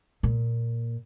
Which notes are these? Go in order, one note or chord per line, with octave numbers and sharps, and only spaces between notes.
A#2